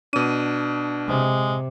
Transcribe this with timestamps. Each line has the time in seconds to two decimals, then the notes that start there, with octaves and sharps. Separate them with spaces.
0.13 B2 D4 D#7
1.08 C3 G#3